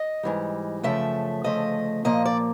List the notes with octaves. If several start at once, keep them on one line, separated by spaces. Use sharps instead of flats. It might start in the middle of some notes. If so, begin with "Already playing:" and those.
Already playing: D#5
G#2 E3 G3
F#2 C#3 F3 A3 E5
D2 C#3 F3 A3 D#5
A#2 F3 A#3 D#5
D5